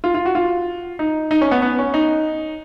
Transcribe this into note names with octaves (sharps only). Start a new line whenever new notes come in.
F4
F4
F#4
F4
D#4
D#4
C#4
B3
B3
C#4
D#4